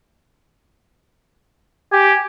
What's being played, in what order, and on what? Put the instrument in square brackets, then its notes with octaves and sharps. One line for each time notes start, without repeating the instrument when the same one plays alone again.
[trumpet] G4 [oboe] G#5